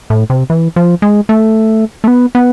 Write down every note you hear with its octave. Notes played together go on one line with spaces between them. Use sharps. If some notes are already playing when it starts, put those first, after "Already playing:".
A2
C3
E3
F3
G#3
A3
A3
B3
B3